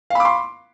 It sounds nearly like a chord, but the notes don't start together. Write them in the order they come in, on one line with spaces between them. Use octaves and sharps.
F5 B5 D6 C6